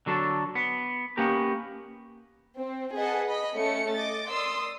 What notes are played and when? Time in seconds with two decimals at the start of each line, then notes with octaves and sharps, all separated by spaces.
0.06 D3 F#3 D4 A4
0.55 B3
1.17 A#3 B3 C#4 G4 A#4
2.61 C4
2.96 G#4 B4 D#5 F#5 A5
3.27 D#5 B5
3.56 A3 C#4 C#7
3.93 D#5 D6 A6
4.28 A#4 D5 C6 D#6 E6